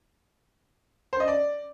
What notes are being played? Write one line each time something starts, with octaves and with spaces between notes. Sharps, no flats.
C5
D#5
D5